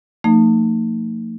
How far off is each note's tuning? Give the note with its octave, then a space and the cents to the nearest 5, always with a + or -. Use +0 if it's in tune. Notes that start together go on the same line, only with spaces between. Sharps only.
F3 -5 A3 +40 D#4 -20